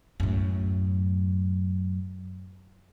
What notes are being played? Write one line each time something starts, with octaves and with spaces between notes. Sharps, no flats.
F#2 A2